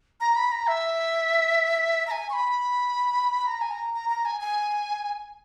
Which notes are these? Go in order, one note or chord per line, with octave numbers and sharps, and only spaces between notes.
A#5
B5
A#5
E5
A#5
G#5
C#6
B5
A#5
G#5
A#5
A#5
A#5
G#5
G#5